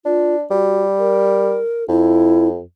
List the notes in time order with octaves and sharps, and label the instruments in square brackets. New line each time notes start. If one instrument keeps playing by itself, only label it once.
[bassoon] D4 [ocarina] F4
[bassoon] G3 [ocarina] F#4
[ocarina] A#4
[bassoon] F2 [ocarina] E4